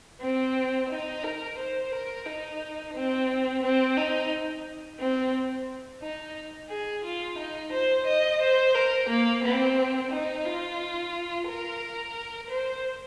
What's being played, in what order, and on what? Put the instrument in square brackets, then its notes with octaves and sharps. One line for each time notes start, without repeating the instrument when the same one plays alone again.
[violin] C4
D#4
A#4
C5
A#4
D#4
C4
C4
D#4
C4
D#4
G#4
F4
D#4
C5
D#5
C5
A#4
A#3
C4
D#4
F4
A#4
C5